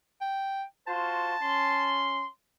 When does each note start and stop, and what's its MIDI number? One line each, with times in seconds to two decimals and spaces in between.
0.21 0.64 79
0.87 1.35 65
0.87 1.35 66
0.87 1.35 72
0.87 2.05 81
1.41 2.24 61
1.41 2.24 84